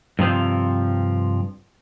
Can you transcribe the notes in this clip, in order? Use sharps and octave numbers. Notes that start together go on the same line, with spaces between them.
G2 C3 F3 C4